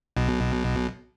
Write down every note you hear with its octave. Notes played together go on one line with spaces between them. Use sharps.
B1 B2